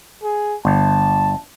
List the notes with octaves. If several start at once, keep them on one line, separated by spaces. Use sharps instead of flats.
G#4
G1 A5